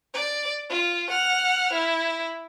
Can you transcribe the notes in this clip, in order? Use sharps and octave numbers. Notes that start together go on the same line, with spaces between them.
D5
F4
F#5 F6
E4